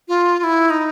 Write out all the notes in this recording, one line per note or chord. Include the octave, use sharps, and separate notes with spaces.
F4
F4
E4
D#4